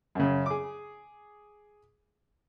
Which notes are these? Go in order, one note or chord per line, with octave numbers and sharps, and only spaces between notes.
F#2 C#3
G#4 D6